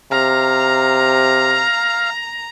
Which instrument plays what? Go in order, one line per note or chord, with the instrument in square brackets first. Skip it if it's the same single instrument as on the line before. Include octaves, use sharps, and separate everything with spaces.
[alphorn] C3 [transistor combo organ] F5 [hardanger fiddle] A#5